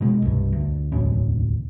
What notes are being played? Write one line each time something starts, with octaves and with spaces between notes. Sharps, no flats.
B2 G#3
C2 G2
D2
E1 A1 D2 C#4